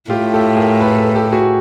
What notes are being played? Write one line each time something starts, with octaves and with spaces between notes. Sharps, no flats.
A2 F4 G4
G4 A4
G#4 A#4
A4 B4
A4 B4
G4 A4
F#4 G#4